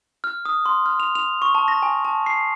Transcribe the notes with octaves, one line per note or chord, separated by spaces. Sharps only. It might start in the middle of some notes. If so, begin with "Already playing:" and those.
F6
D#6
C6
F6
F7
F7
C#6
A5
A#6
G#5
A5
C7